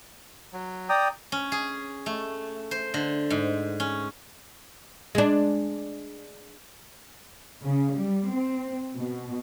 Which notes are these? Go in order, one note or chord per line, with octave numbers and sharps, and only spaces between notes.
F#3
D5 G5 A#5 D#6
C#4
G#4
A3
C5
D3
G#2
C#4
G#3 D4
C#3
G3
C4
B2